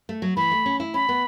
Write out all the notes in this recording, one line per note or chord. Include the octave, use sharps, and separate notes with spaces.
A3
F#3
E3 B5
A3
C#4
E4
C#4 B5
B3